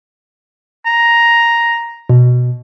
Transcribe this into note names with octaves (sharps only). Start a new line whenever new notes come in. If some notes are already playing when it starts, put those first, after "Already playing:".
A#5
B2